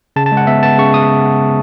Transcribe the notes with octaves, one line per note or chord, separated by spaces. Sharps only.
C#3 A5
A5
G#3
F#5
B3 E5
B3 A5
C#3 C#6
D#6